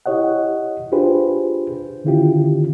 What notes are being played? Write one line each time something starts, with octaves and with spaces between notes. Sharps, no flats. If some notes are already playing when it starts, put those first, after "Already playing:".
E4 G4 C#5 D#5 F#5
D4 F4 G4 G#4 B4 C5
D3 D#3 C#4 E4 F4 G4